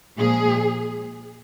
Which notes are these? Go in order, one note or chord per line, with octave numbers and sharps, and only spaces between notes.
A#2 F3 G#3 G#4